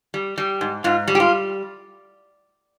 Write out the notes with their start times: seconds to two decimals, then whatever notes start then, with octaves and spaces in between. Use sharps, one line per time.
0.14 G3
0.38 G3
0.61 G#2
0.84 G#2 F4
1.08 G3
1.15 G4
1.20 F4